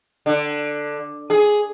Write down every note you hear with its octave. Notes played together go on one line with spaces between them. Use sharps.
D3
G#4